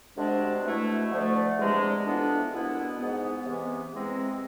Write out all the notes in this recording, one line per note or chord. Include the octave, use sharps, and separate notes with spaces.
D2 C3 G#3 D4
B2 A3 E4
D2 D3 F3 A3 D4
E2 C3 G#3 D4
F2 E3 B3 D4
C2 B2 B3 E4
G#2 G#3 B3
C3 E3 B3
E2 C3 G#3 C4